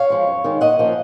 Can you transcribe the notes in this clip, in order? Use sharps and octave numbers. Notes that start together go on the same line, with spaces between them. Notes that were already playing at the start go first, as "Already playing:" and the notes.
Already playing: C#5 F5
F3 G#3
F#2
D#3 G#3
A#2 D#5 F#5
F3 A#3 C#4